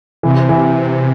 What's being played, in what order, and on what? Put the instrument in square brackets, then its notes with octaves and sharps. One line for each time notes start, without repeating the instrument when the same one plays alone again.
[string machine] C3 [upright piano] E3
[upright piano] E3